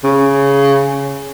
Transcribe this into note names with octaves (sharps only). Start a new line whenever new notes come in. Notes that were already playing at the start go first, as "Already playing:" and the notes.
C#3